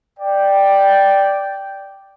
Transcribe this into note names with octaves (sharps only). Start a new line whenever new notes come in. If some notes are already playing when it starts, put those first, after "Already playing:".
D5 G5